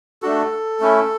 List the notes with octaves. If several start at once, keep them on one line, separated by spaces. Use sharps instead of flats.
A3 D4 F#4 A4
A3 C#4 E4